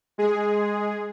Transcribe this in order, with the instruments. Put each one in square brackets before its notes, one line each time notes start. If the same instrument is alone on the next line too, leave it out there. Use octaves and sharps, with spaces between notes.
[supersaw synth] G#3 G#4